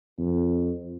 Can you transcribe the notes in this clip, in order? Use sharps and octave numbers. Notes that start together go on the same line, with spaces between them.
F2